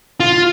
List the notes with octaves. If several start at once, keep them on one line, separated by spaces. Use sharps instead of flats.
F4